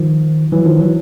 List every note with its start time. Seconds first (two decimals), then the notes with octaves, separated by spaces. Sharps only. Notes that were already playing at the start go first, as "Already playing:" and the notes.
Already playing: D#3 F3
0.52 E3 F#3
0.65 D#3 F3
0.79 E3 F#3